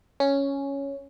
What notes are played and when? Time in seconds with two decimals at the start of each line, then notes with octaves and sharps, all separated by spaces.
0.20 C#4